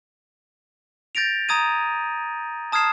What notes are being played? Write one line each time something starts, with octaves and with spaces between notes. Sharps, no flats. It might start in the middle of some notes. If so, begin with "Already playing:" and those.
G6 A6 A#6 D7 F7
A#5 D#6 G#6 D#7
A5 D#6 F6 G#6 C7 E7